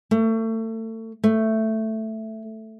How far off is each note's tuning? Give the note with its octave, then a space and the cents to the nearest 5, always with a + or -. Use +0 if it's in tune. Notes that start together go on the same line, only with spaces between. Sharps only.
A3 +30
A3 +5